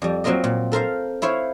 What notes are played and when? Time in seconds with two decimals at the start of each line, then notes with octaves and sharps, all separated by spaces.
0.02 F2 G3
0.24 F#3 A#3 C4 F4 A#4 D#5
0.44 A#2
0.72 A4 A#4 C5 F5
1.22 E4 C5 C#5 F5